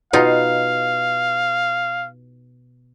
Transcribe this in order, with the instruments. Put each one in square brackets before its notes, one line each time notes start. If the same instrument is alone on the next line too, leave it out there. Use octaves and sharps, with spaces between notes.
[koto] B2 D#4 F4 [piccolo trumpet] F5